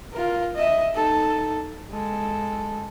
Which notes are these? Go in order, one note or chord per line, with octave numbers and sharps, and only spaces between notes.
F4 A#4
D#5 E5
D#4 A4
G#3 A4